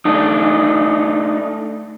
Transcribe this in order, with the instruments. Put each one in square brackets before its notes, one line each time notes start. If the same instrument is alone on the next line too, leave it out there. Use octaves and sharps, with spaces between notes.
[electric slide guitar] A3 D4 D#4